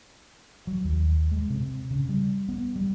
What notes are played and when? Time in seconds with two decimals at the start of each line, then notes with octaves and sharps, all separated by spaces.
0.67 F#3
0.84 D#2
1.32 G#3
1.50 C3
1.90 C#3
2.09 G3
2.49 B3
2.76 G3